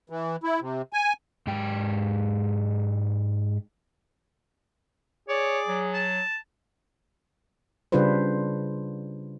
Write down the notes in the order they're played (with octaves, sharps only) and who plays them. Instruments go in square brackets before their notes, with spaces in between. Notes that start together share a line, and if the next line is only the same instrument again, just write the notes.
[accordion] E3
E4
C3
G#5
[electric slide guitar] G#2 G#3 G4 G5
[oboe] G#4 [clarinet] C#5 [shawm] D5
[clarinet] F#3
[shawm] A5
[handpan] C#3 G3 D4 F4 B4 C5